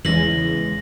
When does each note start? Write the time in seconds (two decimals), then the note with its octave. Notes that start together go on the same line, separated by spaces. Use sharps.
0.05 E2 C#3 E3 G#3 A#6 F#7